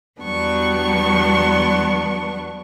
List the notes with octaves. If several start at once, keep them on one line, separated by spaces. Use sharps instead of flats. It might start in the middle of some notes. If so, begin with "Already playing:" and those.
E2 F#3 G3 B3 D4 C#6